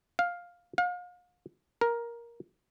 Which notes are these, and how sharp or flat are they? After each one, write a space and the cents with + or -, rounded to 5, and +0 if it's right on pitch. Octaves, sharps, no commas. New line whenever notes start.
F5 +10
F5 +40
A#4 +10